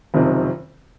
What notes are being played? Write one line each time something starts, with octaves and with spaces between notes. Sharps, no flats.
F#1 F2 C3 D#3